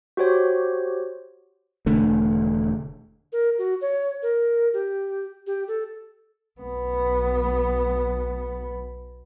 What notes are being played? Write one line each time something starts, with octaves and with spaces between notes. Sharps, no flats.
F#4 G4 C5 C#5
E1 D3 A3
A#4
F#4
C#5
A#4
G4
G4
A4
B1 B3